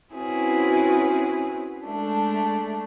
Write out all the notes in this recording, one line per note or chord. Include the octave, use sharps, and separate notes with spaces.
C4 C#4 E4 F#4 G#4 B4
G#3 A3 D4